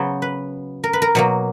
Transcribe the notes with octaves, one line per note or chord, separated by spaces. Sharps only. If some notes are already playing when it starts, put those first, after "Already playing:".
Already playing: C#3 F#3 B3 C5
B4
A#4
B4
A#4
B2 F#3 A#3